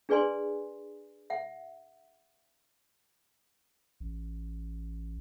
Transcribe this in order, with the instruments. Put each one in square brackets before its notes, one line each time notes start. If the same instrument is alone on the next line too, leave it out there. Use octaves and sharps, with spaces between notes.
[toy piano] D4 G#4 B4 D5 G#5 C6
E5 F#5
[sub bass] A1